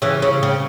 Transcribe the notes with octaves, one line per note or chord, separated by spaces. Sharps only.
C#3 E3
C#3
C#3